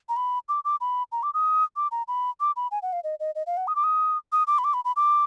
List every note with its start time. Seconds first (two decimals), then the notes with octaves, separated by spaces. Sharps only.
0.09 A#5
0.16 B5
0.49 D6
0.65 D6
0.81 B5
1.12 A#5
1.23 D6
1.34 D#6
1.76 D6
1.91 A#5
2.08 B5
2.40 D6
2.56 B5
2.71 G#5
2.82 F#5
2.93 F5
3.04 D#5
3.20 D#5
3.35 D#5
3.47 F5
3.57 F#5
3.67 D#6
3.76 D6
3.84 D#6
4.32 D#6
4.47 D6
4.58 B5
4.64 D6
4.74 B5
4.85 B5
4.96 D6